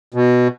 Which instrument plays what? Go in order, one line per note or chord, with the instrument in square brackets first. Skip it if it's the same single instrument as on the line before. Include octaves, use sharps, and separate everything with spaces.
[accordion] B2